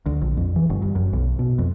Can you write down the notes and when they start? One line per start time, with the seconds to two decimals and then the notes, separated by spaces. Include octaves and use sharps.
0.06 D2
0.22 A#1
0.37 F2
0.56 E3
0.70 G1
0.82 G2
0.95 F#2
1.13 B1
1.39 B2
1.59 F2